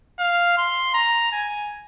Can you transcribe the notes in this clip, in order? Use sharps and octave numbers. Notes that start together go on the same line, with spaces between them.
F5
C6
A#5
G#5